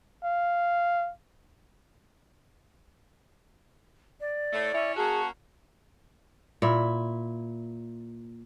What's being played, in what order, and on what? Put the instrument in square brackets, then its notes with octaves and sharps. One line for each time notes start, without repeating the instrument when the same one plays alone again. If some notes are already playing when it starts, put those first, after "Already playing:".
[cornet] F5
[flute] D5
[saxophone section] A2 A3
[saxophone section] C#4 E4 [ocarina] E5
[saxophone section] A#3 C#4 F#4 [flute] G#4 [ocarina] A5
[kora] A#2 E4